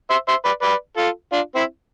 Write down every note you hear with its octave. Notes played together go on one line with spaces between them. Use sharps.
C5 E5
C5 E5
B4 D5
B4 D5
F4 A4
D4 F4
C4 E4